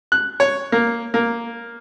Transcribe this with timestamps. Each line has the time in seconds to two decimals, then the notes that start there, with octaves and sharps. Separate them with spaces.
0.12 F#6
0.40 C#5
0.72 A#3
1.14 A#3